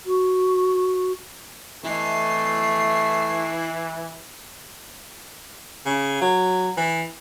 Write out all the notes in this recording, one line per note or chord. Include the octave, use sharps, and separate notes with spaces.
F#4
E3 A3 E4 D#5 C7
C#3
F#3
E3